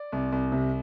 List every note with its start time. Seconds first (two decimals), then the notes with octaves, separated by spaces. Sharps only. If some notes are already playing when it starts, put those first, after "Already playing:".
Already playing: D5
0.12 C2
0.32 C2
0.52 C3